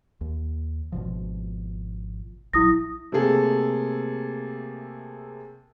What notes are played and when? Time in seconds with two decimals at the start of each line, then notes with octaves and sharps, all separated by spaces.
0.21 D#2
0.92 G#1 B2 F3
2.53 A#1 F#3 E4 D#6 A#6
3.12 C3 A3 A#3 G#4 A4